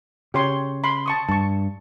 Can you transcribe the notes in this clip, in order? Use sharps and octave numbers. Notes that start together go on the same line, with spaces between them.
C#3 G4 C#5 C6
B5 C6
A5 C#6 D#6
G2 A5 C#6